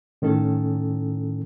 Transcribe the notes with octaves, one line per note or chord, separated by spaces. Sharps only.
A2 D#3 C#4 A4